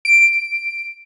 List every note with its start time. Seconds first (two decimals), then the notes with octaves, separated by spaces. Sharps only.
0.05 D7